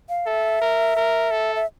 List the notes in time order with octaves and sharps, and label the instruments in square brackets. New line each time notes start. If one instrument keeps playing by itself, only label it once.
[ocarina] F5
[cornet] A4 [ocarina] E5
[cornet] A#4
A#4
A4
[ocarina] E5